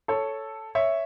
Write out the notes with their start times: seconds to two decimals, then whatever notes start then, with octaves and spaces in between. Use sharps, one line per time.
0.08 A4 C#5
0.75 C#5 E5